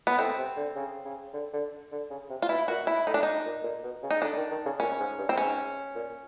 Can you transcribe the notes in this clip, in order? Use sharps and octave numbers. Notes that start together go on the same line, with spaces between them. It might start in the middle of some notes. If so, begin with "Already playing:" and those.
B3
A2 C4
C3
D3
C#3
C#3
D3
D3
D3
C#3
C3
F4
B2 E4
A#2 F#4
E4
A2 D#4
D4
D#4
A#2
A#2
B2
C#3
D#4
D3 D4
D#3
D#3
C#3
A#2 C#4
G#2
G2
C4
G#2 C#4
A#2